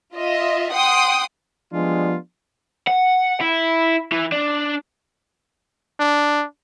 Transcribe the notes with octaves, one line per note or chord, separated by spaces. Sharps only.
F4 D#5 E5
F#5 G5 C6 D#6
F3 G3 G#3 B3 D4 F4
F#5
E4
E3
D4
D4